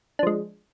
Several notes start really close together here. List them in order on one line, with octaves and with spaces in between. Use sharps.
D4 F3 G#3